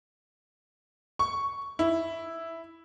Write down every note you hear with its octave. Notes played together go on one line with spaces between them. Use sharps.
C#6
E4